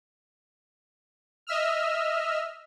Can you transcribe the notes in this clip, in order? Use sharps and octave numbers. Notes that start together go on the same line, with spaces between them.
D#5 E5 E6 F6